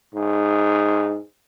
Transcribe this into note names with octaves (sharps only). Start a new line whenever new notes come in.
G#2